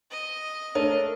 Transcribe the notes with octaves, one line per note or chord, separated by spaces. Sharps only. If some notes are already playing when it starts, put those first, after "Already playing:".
D#5
A3 D4 A#4 C#5